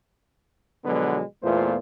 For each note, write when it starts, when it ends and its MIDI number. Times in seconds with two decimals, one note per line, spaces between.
0.85 1.22 47
0.85 1.22 50
0.85 1.22 53
0.85 1.22 54
0.85 1.22 56
0.85 1.22 59
1.43 1.77 40
1.43 1.77 46
1.43 1.77 57
1.43 1.77 59
1.43 1.77 65
1.43 1.77 72